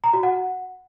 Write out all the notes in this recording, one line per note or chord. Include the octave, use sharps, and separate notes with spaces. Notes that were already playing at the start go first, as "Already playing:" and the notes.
A#5
F#4
F#5